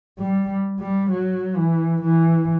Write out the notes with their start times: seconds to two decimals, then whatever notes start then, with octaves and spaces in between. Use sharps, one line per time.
0.19 G3
0.80 G3
1.10 F#3
1.56 E3
2.02 E3